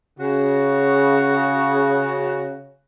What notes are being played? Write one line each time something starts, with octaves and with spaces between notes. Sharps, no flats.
C#3 F#4